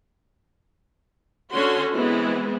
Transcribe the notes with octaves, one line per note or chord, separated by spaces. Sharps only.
D3 C#4 F#4 C6
E3 G#3 B3 C4 E4